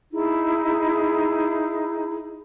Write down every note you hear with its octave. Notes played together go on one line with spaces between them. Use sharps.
D#4 E4 G#4